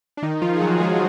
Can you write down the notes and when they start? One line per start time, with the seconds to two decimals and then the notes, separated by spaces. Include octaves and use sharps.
0.17 D4
0.22 D#3 D#4
0.42 F3 F4
0.55 G#4
0.61 F#3 F#4
0.80 G#3 G#4